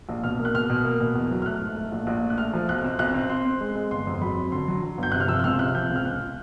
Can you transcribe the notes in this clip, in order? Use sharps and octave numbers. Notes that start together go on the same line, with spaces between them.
A#1
B2 F6
A#3
F#6
B2 F6
B2
A#3
B2
E2
F#3
F6
A3 F#6
G#2
A3
A#1
A#1 F#6
A3
F#6
A3 F6
F3
B1 F#6
C4
B1 F#6
C4
C4 C6
C4
G#3
G#3
G1 C6
F2
C6
F#3 B5
F#3
D3 C6
F#3
F#3
G1
G6
C3 F#6
F6
F3 E6
E6
C#2 F6
C3 F#6
F3 G6
C#2
F6
C#2 F#6